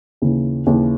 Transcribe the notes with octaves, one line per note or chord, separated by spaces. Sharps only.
D#2 C#3 E3
D#2 C#3 E3